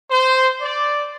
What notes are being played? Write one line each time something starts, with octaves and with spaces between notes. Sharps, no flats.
C5
D5